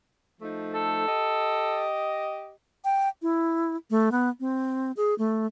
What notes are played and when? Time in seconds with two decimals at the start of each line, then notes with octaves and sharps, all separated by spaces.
0.41 F3 A3 D#4
0.75 A4
1.07 G4 D#5
2.84 G5
3.22 E4
3.90 A3
4.11 B3
4.40 C4
4.97 G#4
5.18 A3